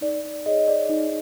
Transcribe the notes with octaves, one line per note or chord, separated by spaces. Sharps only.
D#4 D5
G#4 C#5 D#5
D5
D#4